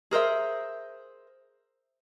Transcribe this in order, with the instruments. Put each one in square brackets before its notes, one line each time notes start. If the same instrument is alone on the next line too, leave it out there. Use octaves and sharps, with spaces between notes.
[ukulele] G#4 A#4 C5 E5